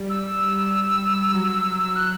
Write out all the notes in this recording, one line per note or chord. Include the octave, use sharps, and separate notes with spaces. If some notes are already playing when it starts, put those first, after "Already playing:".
Already playing: G3
E6
F#3
F#6